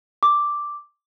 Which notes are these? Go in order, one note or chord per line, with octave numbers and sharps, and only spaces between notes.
D6